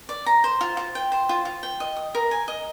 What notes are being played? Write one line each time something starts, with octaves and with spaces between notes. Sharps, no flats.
D5
A#5
C5
F4
F4
G5
C5
F4
F4
G5
D#5
D#6
A#4
G#5
D#5